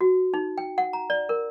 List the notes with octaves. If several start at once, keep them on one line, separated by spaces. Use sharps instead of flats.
F#4
D#4
G5
F#5
A#5
D5
A#4